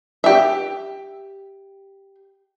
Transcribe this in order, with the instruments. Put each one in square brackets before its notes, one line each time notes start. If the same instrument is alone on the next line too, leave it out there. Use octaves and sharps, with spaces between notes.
[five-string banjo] G4 E5